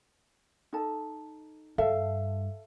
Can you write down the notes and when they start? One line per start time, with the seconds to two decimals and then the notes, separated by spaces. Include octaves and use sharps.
0.73 D#4 A4 A5
1.78 G2 A4 E5 F5